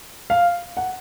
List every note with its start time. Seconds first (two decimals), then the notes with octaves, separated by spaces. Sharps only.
0.30 F5
0.77 F#5